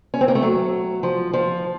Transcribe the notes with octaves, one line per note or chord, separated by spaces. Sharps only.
C#4
C4
A#3
A3
F#3
F3
F3